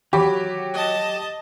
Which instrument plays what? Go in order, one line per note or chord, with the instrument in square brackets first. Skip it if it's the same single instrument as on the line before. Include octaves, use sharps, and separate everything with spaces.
[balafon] D#3 E3 B5 [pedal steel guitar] F#3 F#4 [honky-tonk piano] G4
[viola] D#5 A5